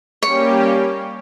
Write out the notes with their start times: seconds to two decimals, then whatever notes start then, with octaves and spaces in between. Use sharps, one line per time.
0.22 G3 A#3 C#4 G4 C#5